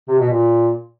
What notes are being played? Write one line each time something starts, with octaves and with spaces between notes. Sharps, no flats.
C3
B2
A#2